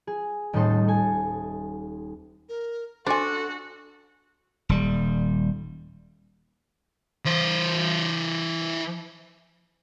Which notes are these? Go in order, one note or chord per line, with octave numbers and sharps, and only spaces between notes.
G#4
D#1 A2 A3 D#4 A4 C6
A4 G#5
A#4
D4 F#4 A4 C5 G#5
D#1 G3
E3 C5